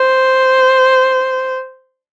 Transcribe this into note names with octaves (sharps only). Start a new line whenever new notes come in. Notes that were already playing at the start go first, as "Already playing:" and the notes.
Already playing: C5